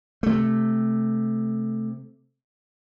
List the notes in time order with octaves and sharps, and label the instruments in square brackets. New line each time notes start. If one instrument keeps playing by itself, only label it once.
[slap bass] C3 A3